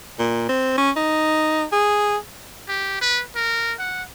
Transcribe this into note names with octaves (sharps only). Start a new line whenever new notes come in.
A#2
C4
C#4
D#4
G#4
G4
B4
A#4
F#5